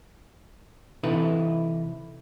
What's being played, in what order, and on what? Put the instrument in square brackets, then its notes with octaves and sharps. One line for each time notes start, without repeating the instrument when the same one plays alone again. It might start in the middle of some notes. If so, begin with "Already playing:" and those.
[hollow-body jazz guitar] C3 E3 D#4 E4 A4 B4